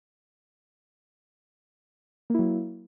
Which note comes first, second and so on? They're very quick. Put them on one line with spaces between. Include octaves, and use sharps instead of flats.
A#3 E4 F#3